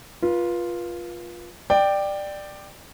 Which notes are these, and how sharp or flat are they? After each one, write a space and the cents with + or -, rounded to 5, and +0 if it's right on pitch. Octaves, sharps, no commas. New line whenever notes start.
F4 +0 B4 -35
D5 +15 G5 +0